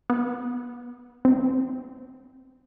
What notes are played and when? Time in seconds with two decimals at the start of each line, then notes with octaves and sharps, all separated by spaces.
0.10 B3
1.25 C4